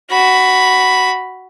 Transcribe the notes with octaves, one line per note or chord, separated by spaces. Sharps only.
F#4 B5